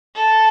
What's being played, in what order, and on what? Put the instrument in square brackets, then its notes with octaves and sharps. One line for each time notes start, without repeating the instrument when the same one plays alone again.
[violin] A4